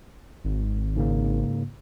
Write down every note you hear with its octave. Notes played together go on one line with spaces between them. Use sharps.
G#1
G#2 C#3 A#3